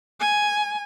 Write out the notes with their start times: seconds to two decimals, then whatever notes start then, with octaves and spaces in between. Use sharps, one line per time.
0.20 G#5